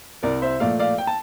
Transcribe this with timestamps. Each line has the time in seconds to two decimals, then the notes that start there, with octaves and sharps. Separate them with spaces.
0.23 C2 A#4 D5
0.42 C5 E5
0.60 A#2 F3 A3 D5 F5
0.79 D5 F5
0.98 G5
1.07 A5